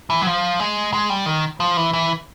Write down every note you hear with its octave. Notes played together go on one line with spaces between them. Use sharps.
E3
F#3
F3
G#3
G#3
G3
D#3
F3
E3
E3